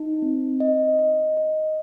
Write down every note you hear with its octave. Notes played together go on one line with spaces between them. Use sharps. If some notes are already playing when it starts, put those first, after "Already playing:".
Already playing: D#4
C4
D#5
D#5
D#5